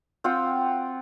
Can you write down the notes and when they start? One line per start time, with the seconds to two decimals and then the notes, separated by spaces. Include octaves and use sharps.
0.24 C4 F4 F#5 G5